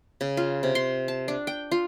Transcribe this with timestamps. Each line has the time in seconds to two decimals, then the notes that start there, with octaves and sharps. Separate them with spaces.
0.21 C#3
0.37 F4
0.63 C3
0.75 C6
1.08 A5
1.28 D4
1.47 G5
1.71 F4